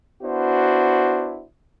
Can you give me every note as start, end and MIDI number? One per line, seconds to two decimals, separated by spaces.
0.23 1.44 59
0.23 1.44 62
0.23 1.44 64
0.23 1.44 66
0.23 1.44 72